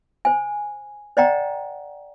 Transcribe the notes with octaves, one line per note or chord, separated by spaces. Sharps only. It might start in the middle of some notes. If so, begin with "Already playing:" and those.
C5 G#5
C5 D5 D#5 F#5 G5 A#5